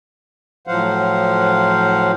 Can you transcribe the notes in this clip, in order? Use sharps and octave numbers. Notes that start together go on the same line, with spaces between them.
A2 F3 F#3 C5 F5 F#5